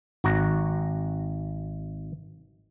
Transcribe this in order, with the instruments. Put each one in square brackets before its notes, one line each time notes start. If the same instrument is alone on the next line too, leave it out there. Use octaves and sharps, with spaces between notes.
[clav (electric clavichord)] G#1 F#4 A#5